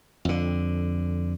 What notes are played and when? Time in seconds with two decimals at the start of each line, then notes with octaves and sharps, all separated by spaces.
0.25 F2 D3